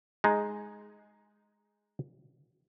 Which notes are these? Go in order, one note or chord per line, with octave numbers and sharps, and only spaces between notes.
G#3 D#4